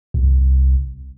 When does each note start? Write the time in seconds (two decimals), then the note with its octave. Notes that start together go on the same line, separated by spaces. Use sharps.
0.14 C2